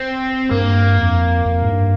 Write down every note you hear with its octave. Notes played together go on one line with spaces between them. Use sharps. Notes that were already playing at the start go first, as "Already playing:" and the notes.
Already playing: C4
G2 A#3
F2
F2
G#2
G2